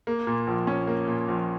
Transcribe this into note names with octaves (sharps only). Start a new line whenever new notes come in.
A#3
A#2
A#1
C#4
A#3
A#2
A#1